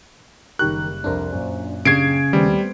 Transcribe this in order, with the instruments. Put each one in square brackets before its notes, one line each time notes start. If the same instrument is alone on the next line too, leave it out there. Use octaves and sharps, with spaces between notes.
[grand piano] F#1 G3 C#6 [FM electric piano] D#3 G4 A#4 [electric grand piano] F#6
[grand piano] C2 F2 A#4 [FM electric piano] D4 C5
[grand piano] F#2 A#2
[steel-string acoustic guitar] C#3 [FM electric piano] D4 G4 [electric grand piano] G#6 C7 D7
[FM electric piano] D#2 [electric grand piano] G3 [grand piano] A3 B3 C4